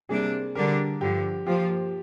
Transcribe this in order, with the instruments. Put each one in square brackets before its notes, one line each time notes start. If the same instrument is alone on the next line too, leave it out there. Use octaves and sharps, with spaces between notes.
[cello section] C3 G3 A#3 D4 [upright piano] G#4
[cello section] D3 G3 D4 G4 [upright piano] A#4
[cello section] G2 D3 F3 [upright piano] G4
[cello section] F3 A#3 F4 [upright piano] G4